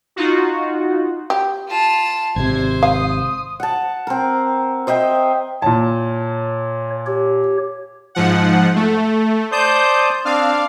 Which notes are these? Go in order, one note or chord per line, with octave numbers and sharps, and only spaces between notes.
D#4 F4 F#4
G4
F4 A5
G#1 C3 C5 G#6
F5 D#6
F#5 A5
C4 A#4
C5 D#5 E5 G5
A#2 C#5 A5
G4 C#5
G#2 F3 F#5
A3
C5 D5 A5 D#6 G6
C4 D4 F5